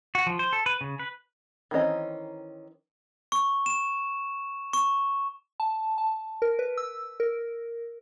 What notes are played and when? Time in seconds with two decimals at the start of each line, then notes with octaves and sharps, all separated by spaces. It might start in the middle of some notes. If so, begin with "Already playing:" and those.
0.15 F#4
0.26 F3
0.39 C5
0.53 A4
0.66 B4
0.81 C#3
0.99 B4
1.71 D#3 E3 C4 C#4 D#5
3.32 C#6
3.66 E7
4.73 C#6
5.60 A5
5.98 A5
6.42 A#4
6.59 B4
6.77 E6
7.20 A#4